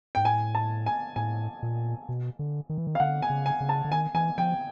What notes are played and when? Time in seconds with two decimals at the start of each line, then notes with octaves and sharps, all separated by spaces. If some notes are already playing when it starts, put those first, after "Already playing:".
0.15 G#2 G5
0.24 A2 G#5
0.55 A5
0.86 G#5
1.16 A2 G#5
1.63 A#2
2.09 B2
2.39 D3
2.69 D#3
2.78 E3
2.87 D#3
2.95 F5
3.00 D3 F#5
3.22 G#5
3.30 C#3
3.46 G#5
3.61 C#3
3.69 A5
3.85 D3
3.91 D#3 G#5
4.14 E3 G#5
4.38 F3 G5